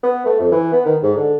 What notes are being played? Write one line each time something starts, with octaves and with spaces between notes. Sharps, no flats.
B3
A3
F2
E3
B3
D#3
G#2
D3